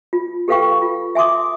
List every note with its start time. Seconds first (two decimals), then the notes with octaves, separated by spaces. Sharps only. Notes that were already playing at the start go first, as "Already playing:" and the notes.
0.13 F4
0.48 G4 A4 B4 F5 G5 C#6
0.82 F4
1.15 E5 G#5 C6 D6 D#6